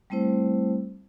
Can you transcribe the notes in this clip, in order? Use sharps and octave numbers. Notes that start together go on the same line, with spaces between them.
G3 A3 C4 E4 C5